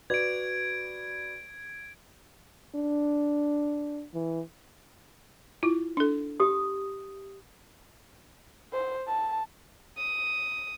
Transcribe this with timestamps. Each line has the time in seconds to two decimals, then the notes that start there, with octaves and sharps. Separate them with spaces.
0.10 F#4 B4 D5 G#6 D7
2.75 D4
4.14 E3
5.63 E4 F4
5.97 D4 A4
6.40 G4 D#6
8.73 C5
9.08 A5
9.98 D#6